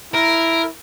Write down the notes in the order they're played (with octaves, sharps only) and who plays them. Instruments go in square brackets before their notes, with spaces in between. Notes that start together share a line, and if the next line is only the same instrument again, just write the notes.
[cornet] E4 [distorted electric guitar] A#4